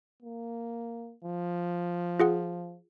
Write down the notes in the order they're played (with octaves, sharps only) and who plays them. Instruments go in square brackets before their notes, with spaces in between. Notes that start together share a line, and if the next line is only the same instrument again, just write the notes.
[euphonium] A#3
F3
[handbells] F4 G#4 F#5